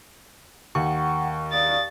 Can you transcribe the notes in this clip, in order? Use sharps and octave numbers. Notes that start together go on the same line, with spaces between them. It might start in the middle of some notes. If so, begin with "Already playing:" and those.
D#2 F#5 G5 C#6
D5 F5 D#6 A6